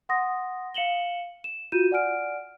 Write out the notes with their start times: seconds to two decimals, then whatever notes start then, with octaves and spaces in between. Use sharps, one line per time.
0.09 F#5 C6 D#6 A#6
0.74 F5 C#7 E7 F#7 G7
1.44 E7
1.72 F4 F#4 G6 D#7 E7
1.91 D5 F#5 G#5 F6 D7